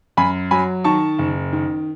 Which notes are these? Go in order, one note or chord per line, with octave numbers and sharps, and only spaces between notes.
F#2 G#5 B5
F#3 G#5 B5
D#3 A5 C#6
F#1
D#3